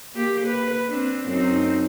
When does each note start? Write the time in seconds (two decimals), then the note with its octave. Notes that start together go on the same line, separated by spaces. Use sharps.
0.15 A#3 G4
0.46 B4
0.87 C4 D4
1.26 F#2 C4 D#4